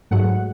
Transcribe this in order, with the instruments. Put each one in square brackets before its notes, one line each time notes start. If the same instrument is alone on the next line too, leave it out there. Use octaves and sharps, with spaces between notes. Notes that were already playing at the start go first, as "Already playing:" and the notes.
[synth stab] G#2 F#3 A3 F#5